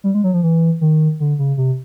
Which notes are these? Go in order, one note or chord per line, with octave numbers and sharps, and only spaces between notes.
G3
G#3
F#3
F3
E3
D#3
D3
C#3
C3